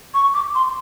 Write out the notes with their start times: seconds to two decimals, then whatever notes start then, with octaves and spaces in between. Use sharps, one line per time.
0.14 C#6
0.34 D6
0.55 C6